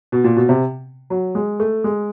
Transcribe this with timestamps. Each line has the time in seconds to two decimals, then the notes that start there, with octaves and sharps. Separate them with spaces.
0.12 B2
0.24 A#2
0.37 B2
0.49 C3
1.10 F#3
1.35 G#3
1.60 A3
1.84 G#3